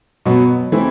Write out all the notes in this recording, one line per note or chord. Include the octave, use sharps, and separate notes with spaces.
B2 F#3 B3
E3 A3 C4 E4